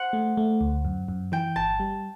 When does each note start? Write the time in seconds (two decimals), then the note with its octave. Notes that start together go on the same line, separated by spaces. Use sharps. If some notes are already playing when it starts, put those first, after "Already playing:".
Already playing: C5 F#5
0.13 A3
0.37 A3
0.61 D2
0.85 F#2
1.08 F#2
1.32 E3 G5
1.56 G1 A5
1.80 G3